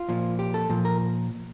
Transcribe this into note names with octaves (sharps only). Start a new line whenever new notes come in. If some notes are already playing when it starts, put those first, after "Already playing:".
Already playing: F4
A#2 F3
G4
A4
A#2 F3
A#4